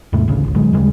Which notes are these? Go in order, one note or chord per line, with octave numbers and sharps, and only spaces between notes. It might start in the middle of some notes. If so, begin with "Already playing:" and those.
D#2 G#2 C3 A3
A1 D2 C#3
G#1 C#2
A2 D3 F#3 G#3
D#2 C#3 G3 G#3